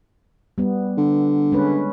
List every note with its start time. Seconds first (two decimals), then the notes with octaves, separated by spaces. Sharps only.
0.58 G3 B3
0.98 D3
1.52 G#3 C#4 B4